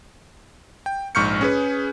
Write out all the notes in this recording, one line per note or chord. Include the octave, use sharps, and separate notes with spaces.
G5
A#1 G#2 C#6 F6 G6 C#7
C#4 G#4 B4